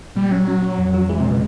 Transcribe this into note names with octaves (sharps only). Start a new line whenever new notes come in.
A#2 G3
F#3 C#4
C#4
C#4
F2
F3
E3 G#3
C3
A#2 B2 C#3